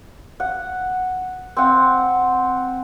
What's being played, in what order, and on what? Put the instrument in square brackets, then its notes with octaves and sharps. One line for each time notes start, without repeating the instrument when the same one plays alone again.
[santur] F#5
C4 F#5